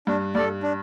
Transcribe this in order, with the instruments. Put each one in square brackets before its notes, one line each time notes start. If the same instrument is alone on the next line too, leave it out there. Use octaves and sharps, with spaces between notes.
[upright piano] G2 [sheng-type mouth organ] D4
[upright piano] G2 [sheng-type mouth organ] A4 D5
[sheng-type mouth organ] D4